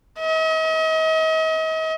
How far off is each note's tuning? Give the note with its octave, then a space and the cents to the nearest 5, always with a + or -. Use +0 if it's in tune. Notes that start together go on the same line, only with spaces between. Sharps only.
D#5 +40